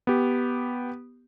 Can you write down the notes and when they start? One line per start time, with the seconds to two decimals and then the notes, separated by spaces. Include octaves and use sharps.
0.07 B3 G4